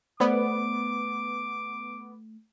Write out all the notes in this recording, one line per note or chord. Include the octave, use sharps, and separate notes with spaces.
A3 B3 B4 C5 D5 D6